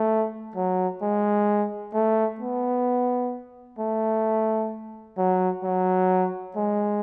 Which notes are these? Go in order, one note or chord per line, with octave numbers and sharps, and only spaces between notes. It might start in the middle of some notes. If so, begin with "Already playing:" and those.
Already playing: A3
F#3
G#3
A3
B3
A3
F#3
F#3
G#3